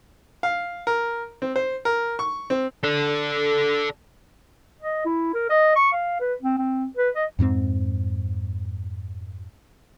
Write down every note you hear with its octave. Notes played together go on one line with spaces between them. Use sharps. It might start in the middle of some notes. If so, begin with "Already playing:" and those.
F5
A#4
C4
C5
A#4
C#6
C4
A4 D5
D#5
E4
A#4
D#5
C#6
F5
B4
C4
C4
B4
D#5
F2 G#2 A3 C4